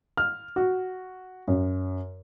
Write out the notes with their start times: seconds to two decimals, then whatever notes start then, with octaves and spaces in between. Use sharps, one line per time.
0.17 F6
0.56 F#4
1.48 F#2